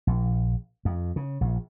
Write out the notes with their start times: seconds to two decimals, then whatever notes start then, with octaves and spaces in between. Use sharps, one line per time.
0.07 A#1
0.85 F2
1.16 C#3
1.41 A#1